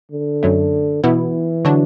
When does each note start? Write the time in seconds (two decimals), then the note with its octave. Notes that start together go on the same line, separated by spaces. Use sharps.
0.12 D3
0.43 F#2 F#3 A3
1.03 B2 E3 B3 E4
1.65 D3 F#3 D4 F#4